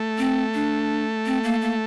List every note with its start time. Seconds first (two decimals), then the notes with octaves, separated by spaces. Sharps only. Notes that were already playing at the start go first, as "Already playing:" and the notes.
Already playing: A3
0.18 C4
0.54 D4
1.26 C4
1.44 A#3
1.62 A#3